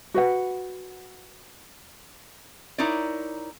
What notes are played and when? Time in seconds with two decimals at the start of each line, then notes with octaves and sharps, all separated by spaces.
0.14 F#4 B4 F#5
2.78 D#4 E4 A#4 C#5 D5